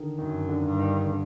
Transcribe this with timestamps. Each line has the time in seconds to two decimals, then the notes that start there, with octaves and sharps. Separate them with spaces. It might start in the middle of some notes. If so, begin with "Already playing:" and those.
Already playing: D3 D#3
0.19 F#2 D#3
0.49 D3
0.65 G2
0.79 D#3
1.04 C#3
1.10 D3